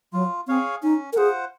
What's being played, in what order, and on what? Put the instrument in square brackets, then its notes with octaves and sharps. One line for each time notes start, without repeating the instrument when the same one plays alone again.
[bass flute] F#3 [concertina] F4
[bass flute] C4 [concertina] G#4 C#5 F5
[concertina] C#4 [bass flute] D#4
[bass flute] A#4
[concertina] F4 C5 F#5 [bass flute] G#4